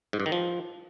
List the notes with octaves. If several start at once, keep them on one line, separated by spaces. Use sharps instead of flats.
G#2
G2
D#3
F3